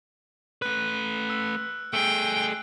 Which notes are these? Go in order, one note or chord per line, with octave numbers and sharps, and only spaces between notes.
A3 B4 F#6
E6
A3 G#4 G5 E6